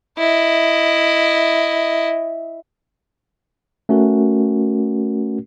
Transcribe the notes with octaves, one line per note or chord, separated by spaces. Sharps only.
E4 D#5
A3 C#4 F#4 A#4